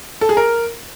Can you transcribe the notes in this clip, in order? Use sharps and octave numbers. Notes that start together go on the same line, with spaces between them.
A4
G#4
A#4